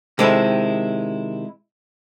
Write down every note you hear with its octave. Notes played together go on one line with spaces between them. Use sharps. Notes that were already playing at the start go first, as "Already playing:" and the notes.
C3 D#3 G#3 C4 E4 A4